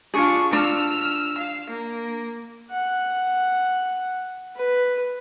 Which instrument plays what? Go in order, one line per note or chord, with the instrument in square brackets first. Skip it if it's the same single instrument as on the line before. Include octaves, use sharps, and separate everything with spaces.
[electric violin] D4 C#6 [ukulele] F4 G#4
[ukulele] D4 F4 [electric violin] E6 F6
[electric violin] F5
A#3
[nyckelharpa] F#5
B4